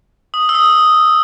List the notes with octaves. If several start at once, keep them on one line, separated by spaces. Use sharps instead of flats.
D#6
E6
D#6